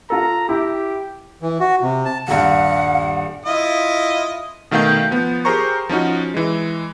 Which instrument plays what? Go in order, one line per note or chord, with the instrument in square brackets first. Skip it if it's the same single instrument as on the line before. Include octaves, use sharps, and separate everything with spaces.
[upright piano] F4 A4 [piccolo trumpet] A#5
[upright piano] E4 [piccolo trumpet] G4
[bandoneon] E3
F#4
C3
A5
[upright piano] D#1 G2 [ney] F5 [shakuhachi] F#5
[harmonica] E4 F4 D#5
[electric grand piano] B2 D#3 A3 F5 G5 G6
F3 B3
G4 G#4 A#4 C5 A#5 C#6
F3 C#4 D#4 F#4
E3 G#3